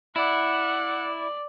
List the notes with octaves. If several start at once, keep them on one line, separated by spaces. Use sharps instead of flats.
E4 D5 F#5